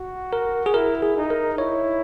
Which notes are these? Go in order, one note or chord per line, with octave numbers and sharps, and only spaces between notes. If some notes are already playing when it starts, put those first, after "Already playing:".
Already playing: F#4
A#4
G#4
E4 A#4
G#4
D#4
A#4
E4 C#5